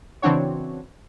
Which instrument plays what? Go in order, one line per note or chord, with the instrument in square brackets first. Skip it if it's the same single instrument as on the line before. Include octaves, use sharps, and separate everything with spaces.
[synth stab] C#3 E3 C4 D4 F#4 C#5